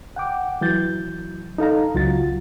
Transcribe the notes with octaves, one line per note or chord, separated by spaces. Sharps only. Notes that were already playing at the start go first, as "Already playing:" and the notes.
F#5 G5 D6
E3 F#3 G6 A6
D#4 A4 F5 A#5
C#2 F#3 F4 F#4 A6